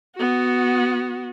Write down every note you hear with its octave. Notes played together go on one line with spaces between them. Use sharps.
B3 F#4